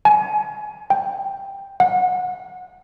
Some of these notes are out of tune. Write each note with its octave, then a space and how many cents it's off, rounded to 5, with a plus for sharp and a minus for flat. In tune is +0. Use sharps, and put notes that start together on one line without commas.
G#5 +30
G5 +5
F#5 -25